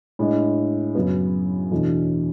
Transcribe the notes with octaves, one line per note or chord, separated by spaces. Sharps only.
A2 G#3 D4
F#2 C#3 F#3 B3
E2 B2 A3 D4